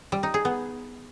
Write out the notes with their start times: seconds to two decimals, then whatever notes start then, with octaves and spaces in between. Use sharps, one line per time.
0.12 G3
0.23 D#4
0.34 G#4
0.45 B3